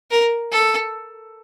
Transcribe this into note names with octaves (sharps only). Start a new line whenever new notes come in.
A#4
A4